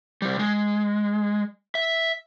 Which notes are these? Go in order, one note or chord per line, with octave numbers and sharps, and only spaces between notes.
C3 G3
G#3
E5